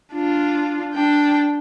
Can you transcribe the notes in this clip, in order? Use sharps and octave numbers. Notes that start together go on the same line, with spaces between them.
D4 F4
D4 G5